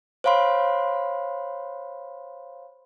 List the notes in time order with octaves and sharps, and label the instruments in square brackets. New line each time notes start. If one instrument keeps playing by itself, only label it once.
[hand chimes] C5 C#5 F5 B5 C6